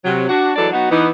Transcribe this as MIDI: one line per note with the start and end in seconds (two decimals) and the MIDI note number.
0.04 0.25 48
0.04 0.25 54
0.28 0.51 62
0.28 0.51 66
0.56 0.68 52
0.56 0.68 54
0.56 0.68 56
0.56 0.68 62
0.56 0.68 69
0.56 0.68 74
0.73 0.90 54
0.73 0.90 59
0.73 0.90 63
0.73 0.90 66
0.91 1.08 52
0.91 1.08 59
0.91 1.08 63